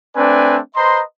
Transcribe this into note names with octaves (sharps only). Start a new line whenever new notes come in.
A3 C4 D4 B4 D5 G#5
B4 C5 D#5 A#5 C6